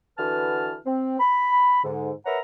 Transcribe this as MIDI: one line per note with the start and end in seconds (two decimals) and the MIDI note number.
0.18 0.75 50
0.18 0.75 52
0.18 0.75 66
0.18 0.75 71
0.18 0.75 81
0.18 0.75 89
0.86 1.18 60
1.20 1.79 83
1.84 2.12 44
1.84 2.12 50
2.26 2.39 70
2.26 2.39 71
2.26 2.39 73
2.26 2.39 76
2.26 2.39 78
2.26 2.39 82